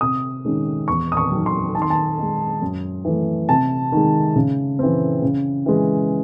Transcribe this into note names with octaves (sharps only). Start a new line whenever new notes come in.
C3 D#6
D#3 G#3 C#4
E2 C#6
D#6
C#6
D#3 F#3
C6
D#3 A5
C6
A5
G#3 D#4
F#2
E3 A3
C3 A5
D#3 G#3
C#3
E3 C4
C#3
E3 G#3